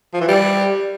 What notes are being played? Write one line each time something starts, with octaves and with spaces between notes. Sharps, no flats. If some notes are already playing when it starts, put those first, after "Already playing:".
F3
E3
G3